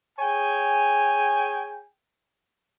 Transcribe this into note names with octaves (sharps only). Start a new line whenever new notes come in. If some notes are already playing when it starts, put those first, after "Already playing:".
G#4 C#5 G5 G#5